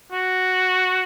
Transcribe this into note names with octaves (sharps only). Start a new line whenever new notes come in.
F#4